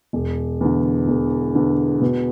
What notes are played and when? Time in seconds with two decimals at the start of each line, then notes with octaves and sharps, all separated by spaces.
0.13 E1
0.61 E2 D3
1.08 E1
1.55 E2 D3
2.02 B2